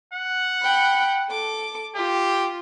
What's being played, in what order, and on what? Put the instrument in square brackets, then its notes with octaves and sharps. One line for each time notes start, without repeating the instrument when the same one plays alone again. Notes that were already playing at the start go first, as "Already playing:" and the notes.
[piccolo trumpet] F#5
[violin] G5 B5
A4 D6
[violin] F4 [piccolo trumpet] G4